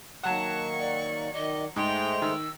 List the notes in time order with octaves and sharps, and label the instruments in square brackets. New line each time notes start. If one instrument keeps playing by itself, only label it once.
[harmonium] D#3 A#3 [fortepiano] F#3 F#5 [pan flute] A5 [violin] C#6
[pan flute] D5
[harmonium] D#3 D5 [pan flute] D#5
[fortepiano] G#2 [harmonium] G#3 A3 C5 [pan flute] D#5 [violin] G5 F7
[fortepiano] D#3 [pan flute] E6